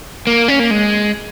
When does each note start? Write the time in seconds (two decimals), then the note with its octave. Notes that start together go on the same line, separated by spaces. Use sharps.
0.27 A#3
0.48 C#4
0.59 A#3
0.71 G#3